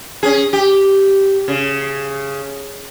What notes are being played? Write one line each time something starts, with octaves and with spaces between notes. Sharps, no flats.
C#4 G#4
G4
C#3